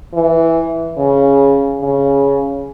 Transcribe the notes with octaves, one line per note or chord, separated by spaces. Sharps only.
E3
C#3
C#3